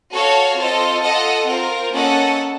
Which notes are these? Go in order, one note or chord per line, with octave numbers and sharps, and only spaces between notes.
F#4 A4 C#5 F5
C4 F4 A4 D#5
F4 A4 D#5 F#5
C4 F4 A#4
A#3 C#4 A4 D#5 F#5